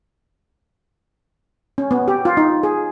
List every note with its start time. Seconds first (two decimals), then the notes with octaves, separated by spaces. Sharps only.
1.78 C#4
1.91 B3
2.08 G4
2.25 F4
2.37 D#4
2.63 G#4